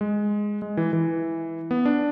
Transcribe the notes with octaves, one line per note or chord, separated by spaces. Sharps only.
G#3
G#3
E3
E3
B3
D4